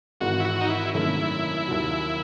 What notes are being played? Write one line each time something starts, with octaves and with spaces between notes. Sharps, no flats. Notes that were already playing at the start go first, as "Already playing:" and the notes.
G#1 G#2 E3 F#4
E4
F#4
D#4
E4
G#1 F#2 D#3 A3 C#4 E4
D#2 D#3 F#3